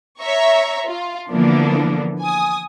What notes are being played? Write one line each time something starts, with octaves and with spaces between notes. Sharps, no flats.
C#5 E5 A#5 C#6
F4
D3 E3 F3 A#3 B3 D4
G#5 D#6